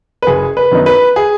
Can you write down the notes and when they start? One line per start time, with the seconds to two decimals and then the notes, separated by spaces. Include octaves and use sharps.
0.22 B4
0.27 F#1 G#4
0.57 B4
0.72 F#2 D#3 B3 D#4
0.86 B4
1.16 G#4